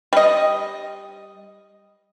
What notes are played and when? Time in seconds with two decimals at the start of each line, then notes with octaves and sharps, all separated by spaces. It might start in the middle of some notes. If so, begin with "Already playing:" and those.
0.13 G3 D#5